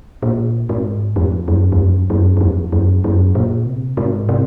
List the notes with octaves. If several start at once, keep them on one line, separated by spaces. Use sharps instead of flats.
A#2
G#2
F2
F#2
F2
F#2
F#2
F#2
F2
F#2
F#2
A#2
C3
G#2
C3